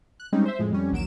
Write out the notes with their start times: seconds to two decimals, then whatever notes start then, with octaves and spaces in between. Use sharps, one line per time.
0.20 F#6
0.32 G3 G#3 C4 C#4 D#4
0.45 C5 E5
0.59 F2 A2 G#3
0.71 F2 G3 C#4
0.92 A#1 D#2 F#3 D7 E7